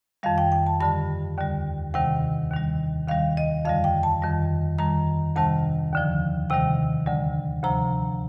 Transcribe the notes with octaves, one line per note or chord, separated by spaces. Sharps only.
F2 D#3 G3 F5
G5
G5
A5
G2 D3 G3 A5
D#2 D3 G3
D2 C3 D#3 G3 G5
D#2 D#3 G3
D#2 D#3 G3 F5
D#5
F2 D3 G3 F5
G5
A5
F2 D#3 G3
F2 D#3 G3 A#5
D2 C3 D#3 G3 A5
D#2 D3 F3
D2 C3 D#3 G3 G5
D2 D3 G3
D2 C3 F3 A#5